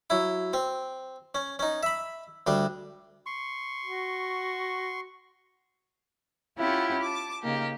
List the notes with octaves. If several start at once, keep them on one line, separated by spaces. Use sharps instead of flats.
F#3 E4
C4
C#4
C#4 D#4
E5 B5
D2 G3 D4
C6 C#6
F#4
C#4 E4 F4 G4 F#5
A5 D6
C#3 A#3 D#4 G4